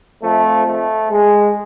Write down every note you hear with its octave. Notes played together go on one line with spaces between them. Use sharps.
F2 F3 A3
A3
G#3